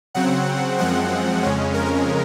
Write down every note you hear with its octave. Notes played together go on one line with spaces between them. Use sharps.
C#3 F#3 C4 F#5
F#2 F3 G#3 C4 F#5
F2 C#3 G#3 C#4
A#4